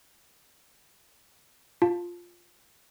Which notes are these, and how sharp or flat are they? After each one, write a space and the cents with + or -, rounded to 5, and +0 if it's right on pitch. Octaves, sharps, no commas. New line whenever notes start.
F4 +5 A5 +0